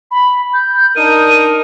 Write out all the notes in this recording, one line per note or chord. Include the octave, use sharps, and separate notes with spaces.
B5
G6
D4 D#4 A#4 D#7